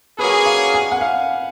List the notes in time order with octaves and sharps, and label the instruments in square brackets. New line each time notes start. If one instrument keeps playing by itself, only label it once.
[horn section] F#3 A#3 C#4 G#4 [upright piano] B4
[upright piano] F5
G#5
F#5
F5